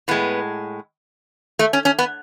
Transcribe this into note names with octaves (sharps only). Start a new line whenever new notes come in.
A2 G#3 B3
A3
C#4
C#4
B3